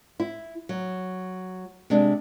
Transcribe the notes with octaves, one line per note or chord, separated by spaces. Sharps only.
E4
F#3
C3 G#3 D4